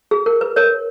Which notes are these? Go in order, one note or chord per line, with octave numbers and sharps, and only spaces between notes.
G#4
A#4
B4
A#4 C#5